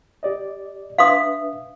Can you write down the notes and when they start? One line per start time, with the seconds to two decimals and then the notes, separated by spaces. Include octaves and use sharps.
0.23 G4 D5 D#5
0.98 D4 B4 E5 F5 C6 D#6